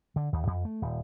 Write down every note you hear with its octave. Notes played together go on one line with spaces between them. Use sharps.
D3
D#2
F2
A3
D#1